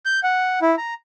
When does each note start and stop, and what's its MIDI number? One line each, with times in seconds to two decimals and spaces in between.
0.05 0.20 91
0.23 0.59 78
0.62 0.75 64
0.78 0.94 82